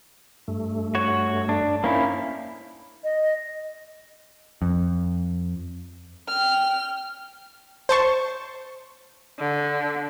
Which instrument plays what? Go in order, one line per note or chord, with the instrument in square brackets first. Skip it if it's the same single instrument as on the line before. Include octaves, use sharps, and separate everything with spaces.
[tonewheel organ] G2 A3
[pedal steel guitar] F#4 C#5
D4
[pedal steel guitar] A#3 C#4 E4 [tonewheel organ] D#4 C5 F5
[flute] D#5
[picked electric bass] F2
[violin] G5 F6
[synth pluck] C5 A5 C#6
[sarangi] D3